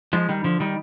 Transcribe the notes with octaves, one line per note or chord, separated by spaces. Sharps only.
F3 G#3
D#3 G3
D3 F3
D#3 G3